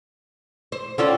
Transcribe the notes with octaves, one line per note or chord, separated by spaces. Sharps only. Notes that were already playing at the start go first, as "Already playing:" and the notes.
C5
D3 C4 C#4 F4